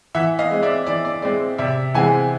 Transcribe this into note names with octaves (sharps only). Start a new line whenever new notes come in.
E3 E5 F#5
D#5 F5
G#3 C4
D5 E5
E3 D5
D5
G#3 C4 D5
C3 D5 E5
E3 G#3 C4 F#5 G#5